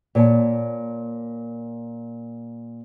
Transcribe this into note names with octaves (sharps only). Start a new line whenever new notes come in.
A#2 C#5 G#5 A5